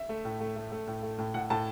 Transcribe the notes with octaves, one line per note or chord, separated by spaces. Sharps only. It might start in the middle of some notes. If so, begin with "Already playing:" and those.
Already playing: E5
A3
A2
A3
A3
A3
A2
A3
A2
A2 F#5
A2 A5